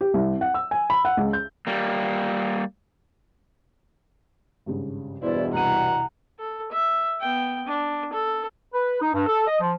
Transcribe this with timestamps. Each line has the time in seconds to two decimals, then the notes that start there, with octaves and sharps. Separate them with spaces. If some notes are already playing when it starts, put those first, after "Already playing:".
0.01 G4
0.14 C2
0.41 F#5
0.54 E6
0.71 G#5
0.90 B5
1.05 F#5
1.17 C#2
1.33 G6
1.67 G3 A#3
4.66 G#1 G2 C#3
5.23 E2 G2 B2 E4 C5 D5
5.54 C2 E4 F#5 A#5 D#7
6.39 A4
6.72 E5
7.20 B3 G5
7.66 D4
8.13 A4
8.73 B4
9.01 D#4
9.14 G2
9.26 A4
9.47 D#5
9.60 F3